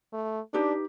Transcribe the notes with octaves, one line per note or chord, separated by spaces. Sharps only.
A3
D4 D#4 G4 B4